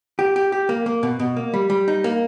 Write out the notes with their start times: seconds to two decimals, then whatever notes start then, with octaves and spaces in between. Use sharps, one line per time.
0.19 G4
0.36 G4
0.52 G4
0.69 A#3
0.86 A#3
1.03 B2
1.20 B2
1.37 A#3
1.54 G3
1.70 G3
1.88 D#4
2.04 A#3